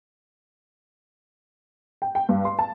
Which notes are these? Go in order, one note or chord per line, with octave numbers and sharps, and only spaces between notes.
G5
G5
G2
C6
A5